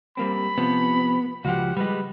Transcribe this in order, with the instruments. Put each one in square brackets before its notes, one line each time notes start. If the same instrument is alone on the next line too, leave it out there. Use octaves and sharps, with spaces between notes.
[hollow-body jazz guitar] G3 A#3 C4 [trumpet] B5
[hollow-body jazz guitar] C3 F3 [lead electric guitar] B3
[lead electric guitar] C#2 F3 [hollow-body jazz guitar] F#4 G4 [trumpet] F#5
[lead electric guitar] G3 G#3 [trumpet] B4